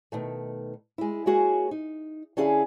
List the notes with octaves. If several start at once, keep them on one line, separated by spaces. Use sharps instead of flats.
B2 D#3 A3
G#3 E4
G#3 A#3 F#4 G#4 C#5
D#4
D3 C#4 E4 G#4 F5